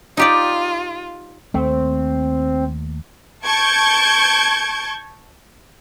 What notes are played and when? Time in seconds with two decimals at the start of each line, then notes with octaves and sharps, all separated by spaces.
0.17 D#4 F4 G4 D5
1.54 D#2 A3 C4
3.45 A5 C#6 G6 G#6 D7